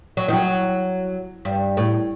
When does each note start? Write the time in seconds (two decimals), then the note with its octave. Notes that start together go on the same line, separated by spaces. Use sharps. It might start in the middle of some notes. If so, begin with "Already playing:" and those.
0.17 F#3
0.28 D#3
0.33 F#3
1.45 G2
1.77 A2